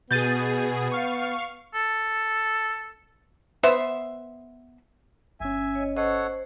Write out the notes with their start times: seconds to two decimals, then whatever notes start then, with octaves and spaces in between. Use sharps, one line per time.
0.11 B2 B3 G#4 G6 A6 D#7
0.92 F5 C#6
1.74 A4
3.63 B3 C5 E5
5.40 G1 C#4 E5 G#5
5.75 C#5 D#5
5.97 A4 C5 C#5 D#5 F#5